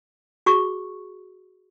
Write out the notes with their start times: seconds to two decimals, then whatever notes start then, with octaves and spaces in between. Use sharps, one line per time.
0.46 F#4 G#4 C#6